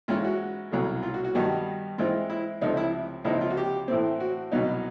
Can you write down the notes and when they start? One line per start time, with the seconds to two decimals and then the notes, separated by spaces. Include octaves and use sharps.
0.08 G#2 E3 G#3 C#4 F4
0.24 F#4
0.71 C2 B2 F#3 A3
1.03 F4
1.14 F#4
1.24 F#4
1.35 G2 D#3 G3 B3 D#4 F#4
1.98 G#2 E3 G#3 C4 D#4 F4
2.30 E4
2.62 C#2 C3 F3 A3 D#4
2.77 E4
3.25 C#2 C3 F3 A#3 D#4 E4
3.41 F4
3.50 F#4
3.57 G4
3.88 A2 E3 A3 C4
4.20 F#4
4.52 C2 B2 F#3 B3 D#4